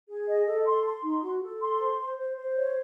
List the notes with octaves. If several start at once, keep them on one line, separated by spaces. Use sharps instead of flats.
G#4
D#5
A4
C6
C6
D#4
F#4
A4
C6
C5
C5
C5
C5
C#5